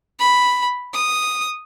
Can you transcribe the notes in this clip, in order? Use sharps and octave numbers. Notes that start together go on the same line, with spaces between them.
B5
D#6